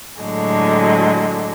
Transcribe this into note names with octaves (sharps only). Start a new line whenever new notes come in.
A2 D3 F#3 G#3